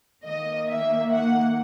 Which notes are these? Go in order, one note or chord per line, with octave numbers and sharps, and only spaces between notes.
D#3 A#3 D#5
E5
F#5